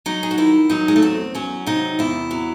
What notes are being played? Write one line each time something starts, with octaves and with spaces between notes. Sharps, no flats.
F#3 D#4
G#4
F#4
D#3 E4
F#3 D#4
G#3
A3
E2 C4
F#3 C#4
C3 D#4
E2 E4
F#3